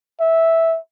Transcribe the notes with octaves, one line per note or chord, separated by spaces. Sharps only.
E5